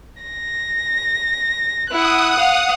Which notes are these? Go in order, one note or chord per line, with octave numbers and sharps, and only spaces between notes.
A#6
E4 F#5 D#6 F#6
F5